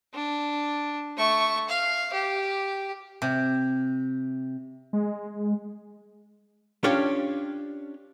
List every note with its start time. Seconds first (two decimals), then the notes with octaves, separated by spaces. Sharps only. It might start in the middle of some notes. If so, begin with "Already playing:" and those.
0.14 D4
1.17 A3 C#6
1.69 F5
2.13 G4
3.22 C3
4.93 G#3
6.84 C#4 D4 F4 G4 C#5